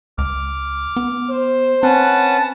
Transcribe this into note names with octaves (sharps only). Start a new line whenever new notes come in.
C#2 D6 F6
B3
C5
C4 C#4 B4 F#5 A5